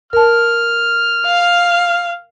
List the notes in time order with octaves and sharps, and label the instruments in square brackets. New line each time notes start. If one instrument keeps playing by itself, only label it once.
[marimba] A#4 A5 [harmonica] F6
[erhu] F5